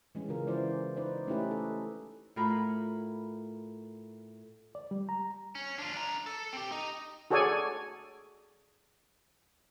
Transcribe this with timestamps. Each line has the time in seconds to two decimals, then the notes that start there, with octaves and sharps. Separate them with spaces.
0.15 E3 G#3 C#4
0.29 C#3 F4 A#4
0.47 E3 E4 F4 C5 D5
0.97 D#4 B4 C5 D5
1.27 A3 C#4 D#4 E4 G4 B4
1.51 A4
2.36 A2 F4 A#4 B5
4.75 D5
4.91 G3
5.09 A#5
5.55 C#4
5.78 D4 F4
5.93 D4 A#5
6.26 A4
6.53 C4 G4
6.72 D#4
7.31 F#4 G#4 A4 C#5 D5 G#5